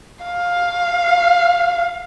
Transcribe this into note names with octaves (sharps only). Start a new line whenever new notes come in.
F5